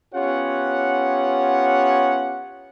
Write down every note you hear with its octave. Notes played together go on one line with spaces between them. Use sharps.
B3 C#4 F4 G4 C#5 F#5